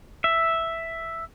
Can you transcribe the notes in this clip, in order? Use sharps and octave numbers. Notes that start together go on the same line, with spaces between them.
E5